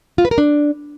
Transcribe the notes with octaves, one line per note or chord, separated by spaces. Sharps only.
F4
B4
A#4
D4